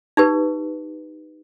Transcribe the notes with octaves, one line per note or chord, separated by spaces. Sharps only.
D#4 G4 B4